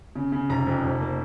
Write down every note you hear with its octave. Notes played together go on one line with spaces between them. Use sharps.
C#3
C#3
F1 A#5
F2
F1
A#3